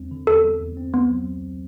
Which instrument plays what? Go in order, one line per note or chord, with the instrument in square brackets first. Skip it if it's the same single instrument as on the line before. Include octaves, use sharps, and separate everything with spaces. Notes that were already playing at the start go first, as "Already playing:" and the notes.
Already playing: [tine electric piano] E2 G3 C4
D3
[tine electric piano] E2 [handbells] A4
[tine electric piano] G3
E2
C4
[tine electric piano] C2 [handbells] B3
[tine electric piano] F#3